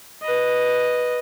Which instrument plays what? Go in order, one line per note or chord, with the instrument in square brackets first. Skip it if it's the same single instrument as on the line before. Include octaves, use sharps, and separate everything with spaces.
[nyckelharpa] B4 D#5